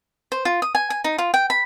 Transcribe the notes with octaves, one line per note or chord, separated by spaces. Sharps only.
C5
F4
D#6
G#5
G#5
D#4
F4
G5
B5